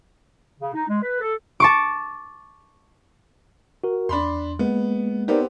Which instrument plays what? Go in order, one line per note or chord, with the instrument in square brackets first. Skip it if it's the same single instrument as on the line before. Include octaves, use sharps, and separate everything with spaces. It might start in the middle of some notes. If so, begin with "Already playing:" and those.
[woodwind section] C#3
D#4
G#3
B4
A4
[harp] A5 C#6 D6
[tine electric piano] F#4 A#4
[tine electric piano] E2 [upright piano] D4 B5 C6
[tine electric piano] G#3 A#3 [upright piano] B3
[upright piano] B3 C4 G4 [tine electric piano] D#4 A#4 D5